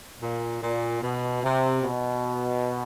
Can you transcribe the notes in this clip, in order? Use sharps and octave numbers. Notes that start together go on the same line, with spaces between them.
A#2
A#2
B2
C3
B2